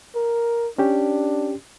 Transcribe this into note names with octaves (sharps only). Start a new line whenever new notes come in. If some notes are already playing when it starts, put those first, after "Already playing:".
A#4
C#4 D4 G4